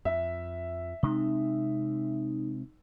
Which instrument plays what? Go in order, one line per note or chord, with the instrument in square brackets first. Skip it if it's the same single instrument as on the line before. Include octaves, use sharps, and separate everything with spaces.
[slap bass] F2 [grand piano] E5
[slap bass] C3 G#3 C4 [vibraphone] D#4